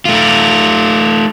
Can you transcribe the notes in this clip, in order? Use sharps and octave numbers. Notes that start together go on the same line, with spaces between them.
A3 F4